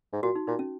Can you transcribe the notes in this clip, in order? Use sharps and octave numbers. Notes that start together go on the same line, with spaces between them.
G#2
A#2 F#4
D#4
A#2 D#4
C#4